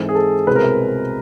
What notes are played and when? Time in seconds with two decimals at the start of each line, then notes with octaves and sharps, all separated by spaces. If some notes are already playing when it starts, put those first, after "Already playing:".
Already playing: G#2 E3 G#3 C4 A4
0.09 G#4
0.15 A4
0.47 C2 B2 G#3 C4 B4
0.56 A#4